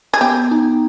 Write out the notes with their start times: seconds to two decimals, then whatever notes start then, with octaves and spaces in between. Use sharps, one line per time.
0.14 G#4
0.21 B3 G4
0.51 D#4